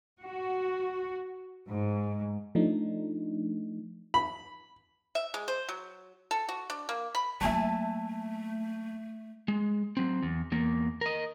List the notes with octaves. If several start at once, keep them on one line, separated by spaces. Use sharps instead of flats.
F#4
G#2
F3 A3 D4 D#4
B5
E5
G#3
C5
F#3
A4
F#4
D4
A#3
B5
F#3 A3 A#3 E5 G#5 A5
G#3
F#3 C4
E2
E2 A#3
A#4 D#5